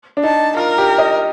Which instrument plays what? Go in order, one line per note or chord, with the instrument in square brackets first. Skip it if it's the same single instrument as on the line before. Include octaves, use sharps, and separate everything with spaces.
[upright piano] D4
[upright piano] D#4 [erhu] A5
[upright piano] F4 [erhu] A#4
[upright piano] G4
D#5